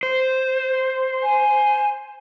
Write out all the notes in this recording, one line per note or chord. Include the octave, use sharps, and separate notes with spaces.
C5
G#5